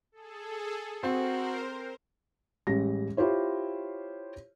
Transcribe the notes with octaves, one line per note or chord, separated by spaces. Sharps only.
G#4 A4
C4 F#4 A#4 C5
A1 G3 G#3 A#6
E4 F4 G4 C5 C#5